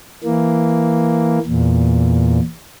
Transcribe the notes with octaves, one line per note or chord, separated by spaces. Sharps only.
E3 A#3
E2 A#2